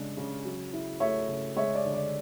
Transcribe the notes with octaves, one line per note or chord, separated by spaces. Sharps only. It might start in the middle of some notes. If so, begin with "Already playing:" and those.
Already playing: C#3 G#3 D4
C#3
F#3
E4
A3 C#5 E5
C#3
G#3 C#5 E5
D5
D3
D5